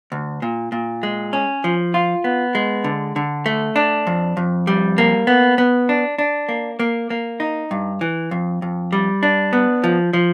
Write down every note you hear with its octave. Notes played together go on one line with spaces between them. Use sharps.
D2
A#2
A#2
G#3
C#4
F3
F4
B3
G#3
D3
D3
A3
D4
F2
F2
G3
A#3
B3
B3
D4
D4
A#3
A#3
A#3
D#4
G2
E3
F2
F2
G3
D4
B3
F3
F3